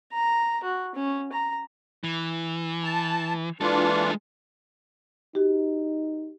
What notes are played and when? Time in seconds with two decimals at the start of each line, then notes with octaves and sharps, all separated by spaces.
0.13 A#5
0.63 F#4
0.95 C#4
1.32 A#5
2.04 E3
2.84 A5
3.61 E3 G#3 D4 F4 A4
5.35 D#4 F#4 G4